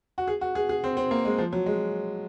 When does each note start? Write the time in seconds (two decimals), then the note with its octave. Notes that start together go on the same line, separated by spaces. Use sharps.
0.18 F#4
0.28 G#4
0.41 F#4
0.55 G#4
0.69 G#4
0.84 C4
0.97 C4
1.11 A#3
1.25 G#3
1.38 F3
1.53 F#3
1.66 G#3